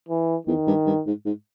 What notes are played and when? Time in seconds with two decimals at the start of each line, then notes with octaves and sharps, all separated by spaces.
0.08 E3
0.47 E2 D#3
0.67 G2
0.87 G2
1.07 G#2
1.26 G#2